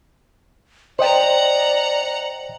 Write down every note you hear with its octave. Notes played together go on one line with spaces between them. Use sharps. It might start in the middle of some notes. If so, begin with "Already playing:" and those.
C5 D5 D#5 F#5 G5 A#5